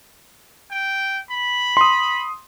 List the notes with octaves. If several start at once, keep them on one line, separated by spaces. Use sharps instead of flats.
G5
B5
C6 D#6